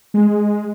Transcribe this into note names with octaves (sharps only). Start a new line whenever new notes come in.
G#3